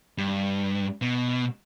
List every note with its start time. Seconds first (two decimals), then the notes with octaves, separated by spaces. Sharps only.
0.18 G2
1.02 B2